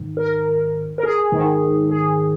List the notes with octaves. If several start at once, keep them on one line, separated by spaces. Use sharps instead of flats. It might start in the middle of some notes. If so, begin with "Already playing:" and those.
Already playing: G#2 D#3
A#4
A#4
G#4
G#2 D#3
G#4